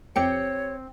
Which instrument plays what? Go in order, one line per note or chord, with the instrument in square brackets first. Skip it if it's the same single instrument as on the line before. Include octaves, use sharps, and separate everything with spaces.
[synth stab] F2 G4 C#7 [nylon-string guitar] C4 G5 [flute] C#5